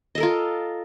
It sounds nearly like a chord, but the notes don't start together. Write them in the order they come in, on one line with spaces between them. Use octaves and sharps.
D#5 A4 A#4 F4